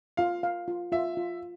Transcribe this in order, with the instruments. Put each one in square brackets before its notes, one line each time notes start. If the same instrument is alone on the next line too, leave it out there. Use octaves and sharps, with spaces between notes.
[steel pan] F4 [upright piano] F5
[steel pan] F5
F4
[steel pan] F4 [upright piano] E5
[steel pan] F4